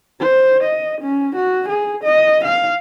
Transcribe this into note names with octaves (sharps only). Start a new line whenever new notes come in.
C5
D#5
C#4
F#4
G#4
D#5
F5